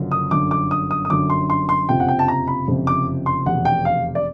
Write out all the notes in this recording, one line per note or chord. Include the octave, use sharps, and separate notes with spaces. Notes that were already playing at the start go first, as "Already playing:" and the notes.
Already playing: F#1 F#2 D3 F3
D#6
G1 F#2 D3 D6
D6
D#6
D#6
D#6
G1 F#2 D3 D6
C6
C6
C6
F#1 F2 C3 F3 G5
F#5
G5
A5
A#5
B5
F#1 F2 C3 F3
D6
C6
F1 E2 B2 F#5
G5
F5
D5